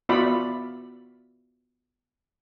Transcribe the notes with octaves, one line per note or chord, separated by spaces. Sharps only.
B3 F4 F#4 D5 E5 B5